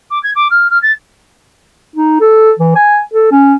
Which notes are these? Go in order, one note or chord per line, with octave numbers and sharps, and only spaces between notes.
D6
G#6
D6
F6
F6
A6
D#4
A4
E3
G#5
A4
C#4